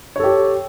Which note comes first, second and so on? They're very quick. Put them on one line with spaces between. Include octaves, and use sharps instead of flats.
C#5 A4 G4